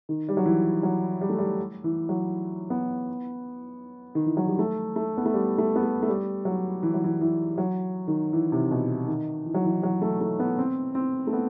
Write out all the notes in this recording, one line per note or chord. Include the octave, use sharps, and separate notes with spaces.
D#3
G3
F#3
E3
F#3
G3
A3
G3
E3
F#3
B3
D#3
E3
F#3
G3
A3
A3
B3
A3
G3
A3
B3
A3
A3
G3
F#3
E3
F#3
E3
E3
F#3
D#3
E3
C3
B2
D#3
E3
F#3
E3
F#3
A3
A3
B3
C4
C4
A3
B3